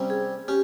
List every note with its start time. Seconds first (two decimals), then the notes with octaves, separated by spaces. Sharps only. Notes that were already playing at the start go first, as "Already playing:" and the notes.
Already playing: C3 G3 C#4
0.10 G#4
0.48 C#4 G4